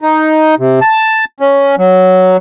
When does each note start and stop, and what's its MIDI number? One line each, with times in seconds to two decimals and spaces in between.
0.02 0.55 63
0.59 0.80 48
0.82 1.25 81
1.40 1.76 61
1.78 2.37 54